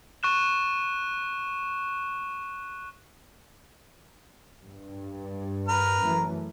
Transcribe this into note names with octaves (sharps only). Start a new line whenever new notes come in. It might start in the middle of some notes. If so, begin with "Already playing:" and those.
C#6 F#6 E7
G2
A#4 B4 F6
F#2 E3 A3